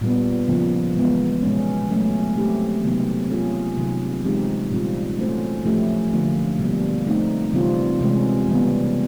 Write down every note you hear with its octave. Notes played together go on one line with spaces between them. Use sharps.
A#2 G3 B3
C#3 F3 A#3
E3 G#3 B3
B2 G#3 C#4
F#3 A3 C#4
A3 C4 E4 G4
C3 D#3 F#3 B3
A#3 C#4 F4 G#4
C3 D#3 F#3
E3 G#3 C4 D#4 G4
A#2 G3 C4 F4
A3 C#4 F#4 A4 C5
F3 A3 C#4 E4 G4
D3 F3 A#3
B2 G3 A#3
A3 C4 D#4
C3 E3 G3 C4 F4
C3 E3 G#3 C#4
C#3 E3 G3 B3